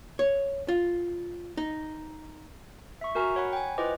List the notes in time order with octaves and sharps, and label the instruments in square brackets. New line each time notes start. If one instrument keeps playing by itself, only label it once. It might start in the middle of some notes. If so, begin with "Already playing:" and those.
[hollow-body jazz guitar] C#5
F4
D#4
[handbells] E5 C#6
F#4 A#4 G#5 A#5 C#6
C#5 F#5 B5
G5 G#5
E4 F4 B4 C5 D#5 D6